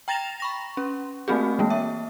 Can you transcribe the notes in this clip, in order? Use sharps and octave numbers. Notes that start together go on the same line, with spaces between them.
G5 A#5 A6 A#6 E7 F7
B5 C#6 A#6
C#4
A3 A#3 C4 F#4 G#4
E3 G#3 A#3
E5